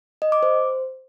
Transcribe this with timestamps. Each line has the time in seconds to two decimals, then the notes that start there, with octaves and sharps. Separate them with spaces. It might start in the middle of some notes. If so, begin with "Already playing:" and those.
0.22 D#5
0.32 D6
0.43 C5